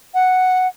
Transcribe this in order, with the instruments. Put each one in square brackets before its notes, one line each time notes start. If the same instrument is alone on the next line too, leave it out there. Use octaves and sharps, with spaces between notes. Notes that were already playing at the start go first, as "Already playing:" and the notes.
[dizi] F#5